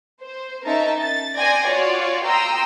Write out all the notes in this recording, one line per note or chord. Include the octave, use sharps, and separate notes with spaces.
C5
C#4 D#4 A#4 E5 A5 A#5
A6
D5 G5 G#5 C6 G#6 A#6
F4 F#4 C#5 D5
G5 A#5 C6 D#6 E6